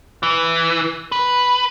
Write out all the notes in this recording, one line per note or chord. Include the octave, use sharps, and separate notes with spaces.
E3
B4